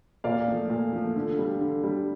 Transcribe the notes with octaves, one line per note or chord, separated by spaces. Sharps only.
A#2 D5 F5
F3 A3
A#2
F3 A3
D3
G3
D3
G3